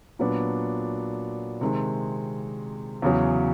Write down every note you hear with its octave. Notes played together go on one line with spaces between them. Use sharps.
A#2 F#3 B3 D4
C3 D#3 G#3 C4
E2 C#3 F#3